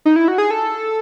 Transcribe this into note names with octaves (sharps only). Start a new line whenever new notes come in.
D#4
E4
F#4
G#4
A4